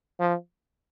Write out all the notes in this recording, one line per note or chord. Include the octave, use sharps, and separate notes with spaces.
F3